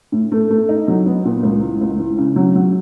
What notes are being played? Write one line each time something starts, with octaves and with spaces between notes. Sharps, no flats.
A2
A3
A3
D#4
F#3
B3
A#2
C#2
E3
C#2
E3
C#3
F#3
F#3